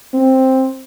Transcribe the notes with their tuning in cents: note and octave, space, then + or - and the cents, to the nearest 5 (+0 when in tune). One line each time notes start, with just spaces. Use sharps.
C4 +5